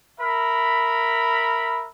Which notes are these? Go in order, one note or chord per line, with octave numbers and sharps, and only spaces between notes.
A#4 E5 B5